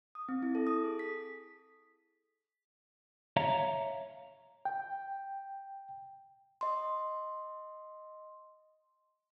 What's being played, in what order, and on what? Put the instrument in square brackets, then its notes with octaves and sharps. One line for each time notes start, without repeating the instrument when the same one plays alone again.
[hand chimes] D#6
C4
E4
A4
D#6
G#4
B6
[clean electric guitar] C#5 E5 F5 A#5
[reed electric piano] G5
[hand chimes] D#5 C6